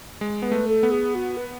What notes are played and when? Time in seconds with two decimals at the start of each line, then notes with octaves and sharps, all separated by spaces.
0.21 G#3
0.42 B3 B4
0.52 A3
0.68 A4
0.83 B3
0.90 G#4
1.14 F#4
1.37 B4